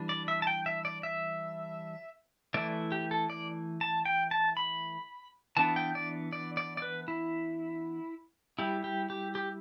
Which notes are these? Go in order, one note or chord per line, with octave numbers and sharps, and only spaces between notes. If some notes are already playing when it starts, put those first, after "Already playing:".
Already playing: E3 G3 D4
D5
E5
A5
G5
E5
D5
E5
E3 A3 E4 D5
G4
A4
D5
A5
G5
A5
B5
E3 B3 D4 A5
G5
D5
D5
D5
D5
B4
E4
G3 E4 G4
G4
G4
G4